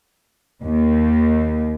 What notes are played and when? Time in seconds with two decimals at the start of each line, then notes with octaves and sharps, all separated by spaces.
0.63 D#2